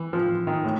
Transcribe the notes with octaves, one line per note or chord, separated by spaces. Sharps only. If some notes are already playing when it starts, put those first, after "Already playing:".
Already playing: E3
F3
D#3
A2